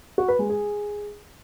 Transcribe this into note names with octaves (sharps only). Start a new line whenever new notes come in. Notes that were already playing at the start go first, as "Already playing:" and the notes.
F#4
B4
G#3
G#4